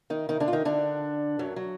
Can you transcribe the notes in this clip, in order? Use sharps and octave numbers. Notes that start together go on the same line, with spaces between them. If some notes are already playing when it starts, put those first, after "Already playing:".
D#3 D#4
D#3 D#4
D3 D4
F4
D#3 D#4
D3 D4
F#2 F#3
F#3